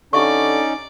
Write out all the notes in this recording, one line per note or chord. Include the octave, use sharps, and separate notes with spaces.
D3 C#4 D#4 G4 D5 E5 C#6